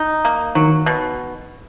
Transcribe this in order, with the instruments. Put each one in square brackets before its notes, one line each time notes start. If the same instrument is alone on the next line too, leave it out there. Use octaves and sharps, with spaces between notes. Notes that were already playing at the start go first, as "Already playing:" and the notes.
Already playing: [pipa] D#4
A#3
[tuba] D#3 [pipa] F#3
[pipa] B2